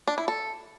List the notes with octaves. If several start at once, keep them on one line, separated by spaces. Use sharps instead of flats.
D4
E4
A4